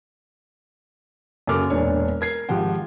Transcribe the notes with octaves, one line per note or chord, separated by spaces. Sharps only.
F#2 C#3 A#3 A4 D6 F6
E1 A#2 D4 C#5
A#4 G#6 C7
G#1 G#2 F3 G4 F#5 G5